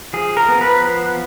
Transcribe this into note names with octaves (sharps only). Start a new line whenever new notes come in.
F3 G#4
A#4
B3
B4
F3